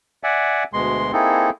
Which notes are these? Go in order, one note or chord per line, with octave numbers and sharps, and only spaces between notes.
D5 E5 F#5 G#5
D2 B2 G#3 C6
A#3 C4 D#4 E4 G#4 A4